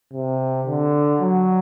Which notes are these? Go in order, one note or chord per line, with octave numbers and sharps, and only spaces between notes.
C3
D3
F#3